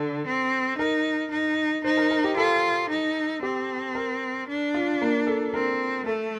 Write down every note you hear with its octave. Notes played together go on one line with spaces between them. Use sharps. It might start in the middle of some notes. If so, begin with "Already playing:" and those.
Already playing: D3 A4
C4
D#4 A#4
D#4
D#4 C5
A#4
A#4
G4
F4 A4
D#4
C4 G4
A#4
D4
F4
A#3
A4
C4 A#4
A3 A4